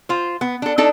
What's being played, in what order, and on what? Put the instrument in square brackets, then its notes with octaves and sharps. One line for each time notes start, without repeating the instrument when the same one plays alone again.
[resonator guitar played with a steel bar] F4 C5
B3
D4 A4
D4 D#4 A4 D5